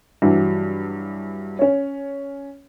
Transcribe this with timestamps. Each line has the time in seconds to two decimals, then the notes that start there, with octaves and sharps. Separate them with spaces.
0.22 G2 E3 F#3
1.59 C#4 C#5